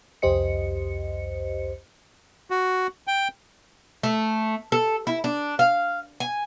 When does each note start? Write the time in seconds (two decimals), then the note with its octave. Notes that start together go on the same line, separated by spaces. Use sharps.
0.22 C2 F2 G4 C5 D#5 C#7
2.50 F#4
3.07 G5
4.03 A3
4.72 A4
5.07 E4
5.24 D4
5.59 F5
6.20 G#5